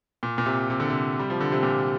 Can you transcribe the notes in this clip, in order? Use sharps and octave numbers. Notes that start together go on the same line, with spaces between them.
A#2
A#2
C3
C3
D3
C3
G3
F3
D3
C3
A#2